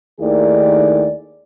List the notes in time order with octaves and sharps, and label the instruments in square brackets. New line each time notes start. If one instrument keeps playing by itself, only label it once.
[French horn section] D#2 D#3 A3 E4 G#4 D5